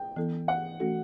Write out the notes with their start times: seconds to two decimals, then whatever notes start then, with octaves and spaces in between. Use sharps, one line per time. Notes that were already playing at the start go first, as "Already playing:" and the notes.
Already playing: G5
0.16 E3 B3 E4 A4
0.48 F#5
0.80 E3 A3 C#4 F#4 A4